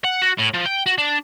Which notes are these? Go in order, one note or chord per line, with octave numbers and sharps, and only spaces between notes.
F#5
F#4
A2
F3
G5
F#4
D4